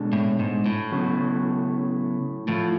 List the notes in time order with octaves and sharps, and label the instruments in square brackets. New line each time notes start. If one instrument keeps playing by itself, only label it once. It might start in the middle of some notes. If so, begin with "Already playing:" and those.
Already playing: [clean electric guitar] B2 G#3 D4 F#4 A4
[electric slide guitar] A2
G#2
A2
[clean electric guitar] C#3 F#3 B3 F#4
[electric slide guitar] A2 [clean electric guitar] F3 A3 F4